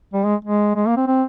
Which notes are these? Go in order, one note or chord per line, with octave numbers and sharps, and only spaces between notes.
G3
G#3
G#3
G#3
A#3
C4
C4